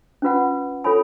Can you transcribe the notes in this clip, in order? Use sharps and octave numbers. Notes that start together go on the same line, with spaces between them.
C#4 F4 B4 F#5
F4 A4 C#5 G#5 B5